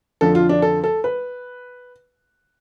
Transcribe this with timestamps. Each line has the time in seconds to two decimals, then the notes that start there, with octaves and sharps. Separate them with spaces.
0.21 F2 D3 F3 A4
0.35 F4
0.49 D4
0.62 A4
0.84 A4
1.04 B4